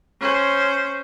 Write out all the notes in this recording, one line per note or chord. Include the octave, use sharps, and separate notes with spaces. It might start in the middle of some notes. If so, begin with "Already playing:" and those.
C#4 C5